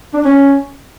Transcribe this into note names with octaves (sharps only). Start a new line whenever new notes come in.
D4
C#4